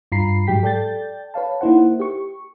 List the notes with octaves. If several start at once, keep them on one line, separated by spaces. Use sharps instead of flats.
G2 F4 A#5 B5 C7
G#2 F#3 G#3 G4 G5 B6
A4 D5 G5 G6 A6
B4 C#5 F5 A5
A#3 D#4 E4 C5 F#5
G4 C#6